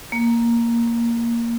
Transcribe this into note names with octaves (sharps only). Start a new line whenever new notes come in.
A#3